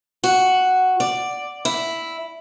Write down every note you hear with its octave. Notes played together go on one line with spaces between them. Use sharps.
F#4
D5
E4